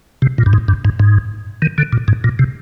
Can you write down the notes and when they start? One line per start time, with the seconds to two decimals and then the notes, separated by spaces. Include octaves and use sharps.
0.22 C3
0.38 A#2
0.46 G2
0.53 G#2
0.68 G2
0.85 G#2
1.00 G#2
1.62 D#3
1.78 D3
1.93 A#2
2.08 G#2
2.24 A#2
2.39 C3